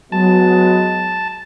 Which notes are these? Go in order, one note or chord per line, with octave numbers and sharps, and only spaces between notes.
F#3 G#3 B3 A5